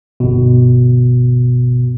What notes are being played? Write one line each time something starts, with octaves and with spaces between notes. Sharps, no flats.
G1 B2